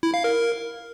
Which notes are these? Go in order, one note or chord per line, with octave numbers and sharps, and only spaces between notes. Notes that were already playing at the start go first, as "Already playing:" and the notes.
E4
F5
A#4